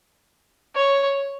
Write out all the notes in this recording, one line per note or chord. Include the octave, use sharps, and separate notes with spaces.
C#5